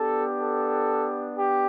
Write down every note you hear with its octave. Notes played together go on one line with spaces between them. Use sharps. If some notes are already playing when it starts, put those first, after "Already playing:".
Already playing: B3 D4 G4 A4
A4
G4